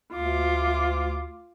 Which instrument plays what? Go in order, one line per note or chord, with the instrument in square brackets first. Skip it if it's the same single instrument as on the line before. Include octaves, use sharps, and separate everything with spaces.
[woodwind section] D2 [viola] F4 D6